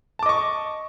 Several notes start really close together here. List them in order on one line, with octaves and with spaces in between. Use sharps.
A5 D6 D#5 C#6